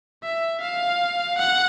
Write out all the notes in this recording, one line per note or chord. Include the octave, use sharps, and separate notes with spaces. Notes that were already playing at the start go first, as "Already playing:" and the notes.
E5
F5
F#5